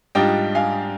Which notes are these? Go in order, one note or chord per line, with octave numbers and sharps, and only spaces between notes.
G#2 G3 D4 F4 D#5 G5
F5 G#5